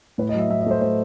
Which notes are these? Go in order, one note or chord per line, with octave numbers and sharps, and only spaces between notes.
A2 B4
D#5
F#3
E5
A2 E5
D#5
A3 C5
A2 C5